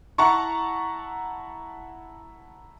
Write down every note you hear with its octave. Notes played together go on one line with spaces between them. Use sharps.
E4 F#5 A5 A#5 C#6